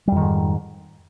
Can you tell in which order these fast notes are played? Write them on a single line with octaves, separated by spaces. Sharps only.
G3 F2 D#3 G#2